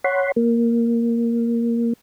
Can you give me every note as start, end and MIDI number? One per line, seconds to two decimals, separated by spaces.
0.04 0.32 73
0.04 0.32 78
0.04 0.32 83
0.04 0.32 84
0.36 1.93 58